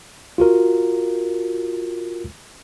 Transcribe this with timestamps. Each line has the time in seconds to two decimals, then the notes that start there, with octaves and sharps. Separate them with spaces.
0.38 F4 F#4 A#4